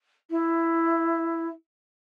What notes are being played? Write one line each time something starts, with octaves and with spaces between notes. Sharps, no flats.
E4